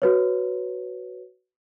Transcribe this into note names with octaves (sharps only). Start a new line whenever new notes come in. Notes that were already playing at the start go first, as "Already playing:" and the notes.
F#4 B4 C#5